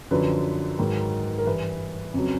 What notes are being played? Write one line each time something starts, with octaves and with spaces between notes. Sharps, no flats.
F#2 D3 F3 B4
G#2 D#3 F#3
A#4
G2 E3 B4
F2 C#3 F#3